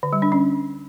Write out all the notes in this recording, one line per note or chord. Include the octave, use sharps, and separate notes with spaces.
D3
G3
D4
C#4